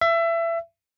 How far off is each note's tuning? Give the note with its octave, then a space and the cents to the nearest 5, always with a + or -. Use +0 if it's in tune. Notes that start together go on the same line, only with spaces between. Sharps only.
E5 +25